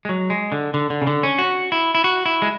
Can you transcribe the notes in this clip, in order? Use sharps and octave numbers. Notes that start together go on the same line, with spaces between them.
G#3
F#3
G#3
D3
D3
D3
C#3
D3
C#4
F#4
E4
E4
F#4
E4
G#3